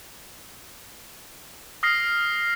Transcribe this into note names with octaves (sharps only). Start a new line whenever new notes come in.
D#6 F6 A#6 C7